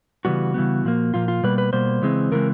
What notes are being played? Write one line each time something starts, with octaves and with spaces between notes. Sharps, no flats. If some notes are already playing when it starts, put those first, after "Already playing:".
C#3 E3 G3 B3 F#4
C#3 E3 G3 B3
A#2 F3 A#3
A#2 F3 A#3 F4
F4
B2 G3 A#3 B4
B4
B2 G3 A#3 C5
C#3 E3 G#3 C4
C#3 E3 G#3 C4 A#4